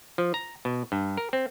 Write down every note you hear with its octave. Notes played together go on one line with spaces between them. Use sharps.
F3
A#5
B2
G2
A#4
C4